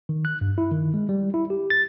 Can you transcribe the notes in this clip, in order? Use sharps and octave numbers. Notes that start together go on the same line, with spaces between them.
D#3
F#6
G2
E4
D#3
G#3
G3
E4
G4
A6